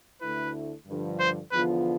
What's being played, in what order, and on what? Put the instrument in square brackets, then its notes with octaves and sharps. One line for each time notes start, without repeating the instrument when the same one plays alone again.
[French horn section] D2 D3 A3 E4 [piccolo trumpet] B4
[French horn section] G2 D3 F3
[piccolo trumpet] C5
[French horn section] E2 D3 F3 B3 F4 [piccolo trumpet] B4